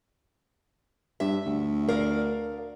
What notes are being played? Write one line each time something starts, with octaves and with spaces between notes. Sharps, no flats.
G2 E5
D2
A#4 D5 F5